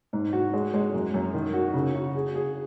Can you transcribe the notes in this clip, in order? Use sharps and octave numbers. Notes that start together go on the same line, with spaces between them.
G#2
F#4
G#3
G#3
F#2
F#2
D#3
F#4
C#3
F#4
G#4
G#4